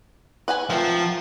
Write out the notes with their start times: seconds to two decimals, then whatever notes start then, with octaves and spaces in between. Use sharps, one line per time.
0.48 B4 F#5 G#5
0.70 F3 A3 C4 A#4